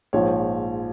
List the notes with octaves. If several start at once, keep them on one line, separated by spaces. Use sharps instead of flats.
A#1 G#2 F3 C#5